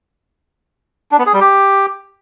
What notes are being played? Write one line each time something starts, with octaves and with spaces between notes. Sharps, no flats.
D4
B3
G#4
G3
G4